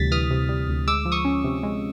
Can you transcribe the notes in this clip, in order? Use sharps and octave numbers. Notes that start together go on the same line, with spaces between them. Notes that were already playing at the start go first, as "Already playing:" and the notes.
Already playing: D2 C3 E3 G3 A6 B6
E3 D#6 F6
C3
G3
D2
G#3 D6 E6
F3
C#6 D#6
C#4
C3
G#3